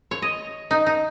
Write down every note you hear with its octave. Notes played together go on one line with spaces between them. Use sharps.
C#5
D#5
D#4
D#4